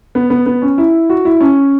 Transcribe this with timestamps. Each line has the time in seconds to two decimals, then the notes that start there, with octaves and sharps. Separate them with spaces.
0.15 B3
0.30 B3
0.46 B3
0.62 C#4
0.78 E4
1.10 F#4
1.25 E4
1.41 C#4